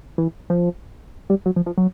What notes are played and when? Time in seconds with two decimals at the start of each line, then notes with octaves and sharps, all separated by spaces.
0.18 E3
0.50 F3
1.30 G3
1.46 F#3
1.56 F3
1.66 F3
1.78 F#3